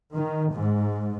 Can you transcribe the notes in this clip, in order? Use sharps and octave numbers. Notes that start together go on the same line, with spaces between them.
D#3
G#2